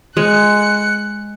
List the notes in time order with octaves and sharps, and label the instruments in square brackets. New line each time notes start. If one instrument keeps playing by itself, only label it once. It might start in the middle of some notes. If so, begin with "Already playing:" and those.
[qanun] G#3 [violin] F#6 C#7